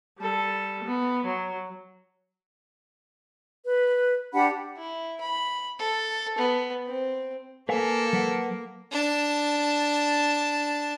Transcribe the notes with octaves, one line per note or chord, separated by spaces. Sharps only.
G3 A4
B3
F#3
B4
D4 G4 F#5 B5
E4
B5
A4
B3
C4
A#3 A4 B4 F5 G#5
F#3 B4 F#5
D4 A5